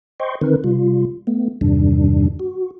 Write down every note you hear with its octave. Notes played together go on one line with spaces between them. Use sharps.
C5 D#5 G5 C6 C#6
D3 D#3 C4 D#4 A#4 B4
C3 G3 F4
A3 B3
E2 G2 C3 D#3 G3 D4
F#4